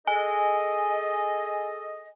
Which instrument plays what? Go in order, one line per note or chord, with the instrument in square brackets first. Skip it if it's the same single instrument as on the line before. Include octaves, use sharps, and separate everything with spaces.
[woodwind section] G#4 A4 D#5 [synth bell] G#5